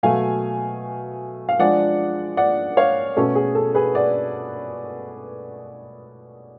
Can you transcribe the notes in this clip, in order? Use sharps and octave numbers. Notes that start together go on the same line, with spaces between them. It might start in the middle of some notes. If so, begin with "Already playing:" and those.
B2 F#3 A3 F5 G#5
F5
F3 G#3 D4 D5 F#5
D5 F#5
C#5 F5
B2 A3 C#4 A4
G#4
A4
G#4 B4
D5 F#5